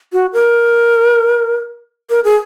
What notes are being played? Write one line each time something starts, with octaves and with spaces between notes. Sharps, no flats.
F#4
A#4
A#4
G#4